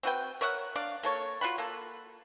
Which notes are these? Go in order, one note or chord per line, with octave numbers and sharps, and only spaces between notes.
C4 F#4 B4 G5
A#4 C#5 E5 F#5
D4 D5 F5
A#3 A4 C#5
F4 F#4 F#5 B5
A#3 A4